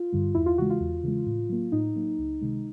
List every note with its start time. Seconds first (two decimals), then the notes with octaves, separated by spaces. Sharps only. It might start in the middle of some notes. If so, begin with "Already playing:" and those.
Already playing: F4
0.12 G2 D3 G3
0.35 E2 E4
0.46 F4
0.58 C#3 E3 G#3 F#4
0.70 F4
0.80 E2
1.03 C#3 E3 G#3
1.26 A2
1.49 F#3 A#3
1.72 A2 D#4
1.96 F#3 A#3
2.18 C#2
2.41 C3 D#3 G#3